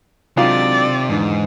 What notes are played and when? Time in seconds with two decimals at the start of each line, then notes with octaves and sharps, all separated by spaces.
0.37 C3 D#3 F#3 G#3 D4 F4 D5
1.09 E2 G#2 D3 D#4